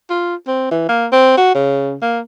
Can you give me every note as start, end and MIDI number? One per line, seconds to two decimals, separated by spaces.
0.10 0.35 65
0.47 0.68 60
0.71 0.87 52
0.89 1.07 58
1.12 1.34 60
1.37 1.53 66
1.55 1.95 49
2.02 2.20 58